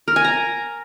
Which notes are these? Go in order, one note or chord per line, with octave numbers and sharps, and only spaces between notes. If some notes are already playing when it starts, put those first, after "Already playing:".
A#4
G#5
A#5